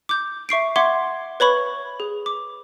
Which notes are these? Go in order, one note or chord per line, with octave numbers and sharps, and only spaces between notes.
D6 G6
E5 C#6 C7 D7
E5 F#5 C6 D6 G#6
B4 C#5 B5 C#6
G#4
D6